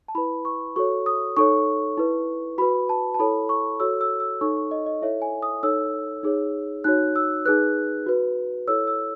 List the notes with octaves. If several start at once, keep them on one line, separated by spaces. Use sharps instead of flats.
A5
E4 B4 B5
C#6
F#4 A4 C#5 C#6
D#6
D#4 A4 C#5 C#6
E4 B4
F#4 B4 B5
A5
A5
E4 A4 C#5 B5
C#6
F#4 A4 C#5 E6
E6
E6
D#4 A4 C#5 C#6
C#6
D#5
D#5
E4 A4 C#5 E5
G#5
D#6
D#4 A4 C#5 E6
D#4 G#4 C#5
D#4 F#4 C#5 F#6
E6
D#4 G#4 B4 F#6
F#4 B4
E4 A4 C#5 E6
E6